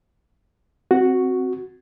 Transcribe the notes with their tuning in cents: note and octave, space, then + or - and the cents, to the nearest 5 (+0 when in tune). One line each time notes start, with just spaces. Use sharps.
C4 +0 F#4 +0